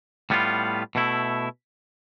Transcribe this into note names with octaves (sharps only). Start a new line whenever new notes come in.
A2 G3 B3 F4
B2 A3 E4